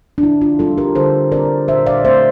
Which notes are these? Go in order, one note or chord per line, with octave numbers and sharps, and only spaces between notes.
D4
D3 E4
D4 F4
G3 C4 F4 A4
G4 A#4
D3 A4 C5
G3 C4 A#4 D5
A#2 C5 E5
D5 F5
A3 C4 C5 E5